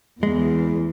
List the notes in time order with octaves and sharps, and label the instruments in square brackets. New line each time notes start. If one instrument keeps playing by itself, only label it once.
[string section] E2 [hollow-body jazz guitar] G#3